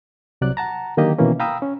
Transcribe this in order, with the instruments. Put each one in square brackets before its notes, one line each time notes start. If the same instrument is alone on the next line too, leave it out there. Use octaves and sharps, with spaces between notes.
[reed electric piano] C2 C3 F#3 D5 F#6
F#5 A5 A#5
D3 D#3 F#3 A#3 G4 D#5
B2 D#3 E3 A#3 C#4
F5 G5 A#5 B5 D#6 E6
C#4